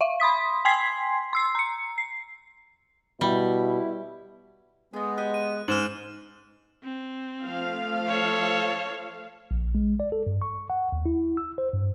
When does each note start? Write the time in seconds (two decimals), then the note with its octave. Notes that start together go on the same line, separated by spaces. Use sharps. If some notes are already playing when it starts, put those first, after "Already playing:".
0.01 E5 F5
0.20 B5 C6 D#6 B6
0.65 G5 G#5 C6 G#6 B6 C7
1.33 C6 E6 C7
1.55 A#5 C#7
1.98 C7
3.21 B2 G3 E4
4.94 G#3 B3 D#4 G#4
5.18 G4 D#5 F#6
5.34 D#7
5.68 G#2 G5 F6 E7 F#7
6.84 C4
7.46 F3 A3 F5
8.07 A4 C#5
9.51 A#1
9.75 G#3
10.00 D5
10.12 A4
10.27 G2
10.42 C#6
10.70 F#5
10.92 D#2
11.06 E4
11.37 E6
11.58 C5
11.73 G2